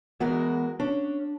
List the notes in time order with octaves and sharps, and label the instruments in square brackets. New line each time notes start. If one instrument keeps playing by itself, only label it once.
[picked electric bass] E3 B3 [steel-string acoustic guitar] G#3 F#4 A#4
[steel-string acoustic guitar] C#4 [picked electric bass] D4